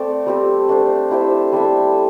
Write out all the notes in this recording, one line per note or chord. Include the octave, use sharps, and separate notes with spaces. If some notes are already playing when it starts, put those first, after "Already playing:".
Already playing: A3 C4 A4 D5
G3 C4 G4
A3 D4 C5
E4 G4 C5 E5
G3 D4 A4 E5